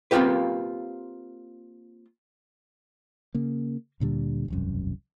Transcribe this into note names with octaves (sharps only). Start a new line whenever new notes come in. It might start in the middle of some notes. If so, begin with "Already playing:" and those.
A#3 C4 D#4 F4 G4 B4
C#3 A#3
D2 A#2 D3 G3
E1 C2 F#2